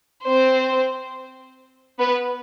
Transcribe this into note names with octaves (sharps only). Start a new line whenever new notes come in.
C4 C5
B3 B4